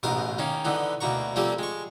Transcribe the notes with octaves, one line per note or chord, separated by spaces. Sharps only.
A1 G#2 B2 A#4 F5 D#6
D#3 A#3 C#4 D#4
D3 E3 B3 D#4
D2 B2 A#3 A#5 C#6
F3 G3 A3 A#3 C4 G4
G#3 C#6